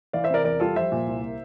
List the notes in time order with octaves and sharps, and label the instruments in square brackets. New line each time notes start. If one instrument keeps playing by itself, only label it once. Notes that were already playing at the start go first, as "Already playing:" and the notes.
[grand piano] E3 D5 F5
C5 E5
C3 A#4 D5
E2 A#4 D5
G3 F4 A4
F3 C5 E5
A#2
C2
A#3